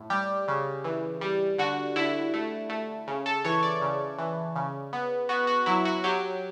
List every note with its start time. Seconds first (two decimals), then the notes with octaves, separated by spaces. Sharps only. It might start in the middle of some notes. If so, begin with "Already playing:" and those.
Already playing: A2
0.10 G3 G4
0.48 C#3
0.84 E3
1.21 G3
1.58 D3 F#4
1.96 D3 E4
2.34 A3
2.69 A3
3.08 C#3
3.26 A4
3.44 E3 C#5
3.63 D5
3.82 C#3
4.18 E3
4.56 C#3
4.93 B3
5.29 B3 F#4
5.47 F#4
5.66 F#3 E4
5.85 F#4
6.04 F#3 G4